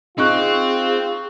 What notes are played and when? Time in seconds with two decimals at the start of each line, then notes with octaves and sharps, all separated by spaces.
0.18 C4 D#4 F4 G#4 C#6 F#6